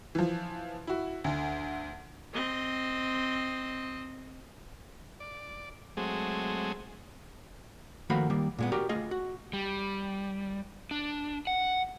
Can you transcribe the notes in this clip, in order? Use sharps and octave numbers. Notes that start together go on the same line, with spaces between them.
E3 F3
E4 F#4
D2 D3
C4 D#5
D5
F#3 G#3 A3 C4 G#4
D#3 F3 A3 A#3 F#4 B5
D#3 G3 A#3
A#2 G#3 B3
F#4 G4 A#4 D5
A3 F4 G#4 D#5
F#4
G3
D4
F#5